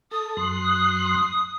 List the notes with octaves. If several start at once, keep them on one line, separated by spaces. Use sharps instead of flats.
A4 D#6
F#2 C6 F#6